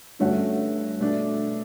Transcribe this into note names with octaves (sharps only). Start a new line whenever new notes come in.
G2 D3 A3 C#4 F#4
B2 A3 D4